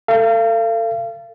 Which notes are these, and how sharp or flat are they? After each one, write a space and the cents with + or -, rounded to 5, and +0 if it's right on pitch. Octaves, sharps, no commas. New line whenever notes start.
A4 +30 F5 -35